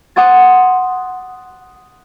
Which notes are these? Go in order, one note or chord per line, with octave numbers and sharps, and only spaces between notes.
F#5 C6 D6 D#6 G#6 A6